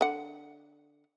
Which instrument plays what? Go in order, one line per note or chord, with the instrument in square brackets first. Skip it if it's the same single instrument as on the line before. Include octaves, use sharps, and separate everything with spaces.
[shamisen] D3 F#5